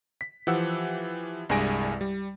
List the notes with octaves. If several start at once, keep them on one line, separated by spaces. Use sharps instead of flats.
B6
E3 F3 G4 F#5 E6
C2 G2 G#3 G#5 A#6 D7
G3